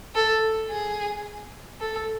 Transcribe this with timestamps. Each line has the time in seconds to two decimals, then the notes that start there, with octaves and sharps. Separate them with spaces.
0.15 A4
0.71 G#4
1.81 A4